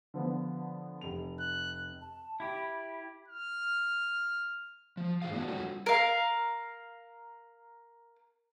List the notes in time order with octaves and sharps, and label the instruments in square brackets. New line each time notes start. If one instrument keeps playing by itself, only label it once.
[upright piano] D3 F3 B3
F1 F7
[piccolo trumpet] F#6
[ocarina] A5
[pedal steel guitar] E4 G4 [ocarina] B5
[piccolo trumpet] F6
[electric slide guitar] F3
G#2 E3 F4 G#4 F5
B3 D4 E4 F#4
G3 D4 F4 F#4 A4 C#5
[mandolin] A#4 F5